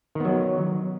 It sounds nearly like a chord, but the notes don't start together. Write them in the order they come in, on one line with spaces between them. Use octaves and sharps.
D#3 B3 F#3